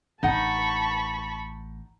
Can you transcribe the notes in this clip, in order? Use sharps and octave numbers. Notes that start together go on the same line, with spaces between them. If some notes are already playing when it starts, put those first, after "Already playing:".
A1 D#4 F#5 A5 B5 C#6